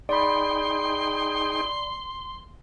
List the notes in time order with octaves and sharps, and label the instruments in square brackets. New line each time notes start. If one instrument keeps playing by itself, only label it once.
[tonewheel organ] D#4 G#4 G5 [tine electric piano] D5 B5 [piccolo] C6